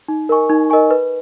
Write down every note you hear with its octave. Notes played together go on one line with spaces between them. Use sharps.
D#4
A#4 D#5 G#5 C#6
D#4
A#4 D#5 G#5 C#6
B4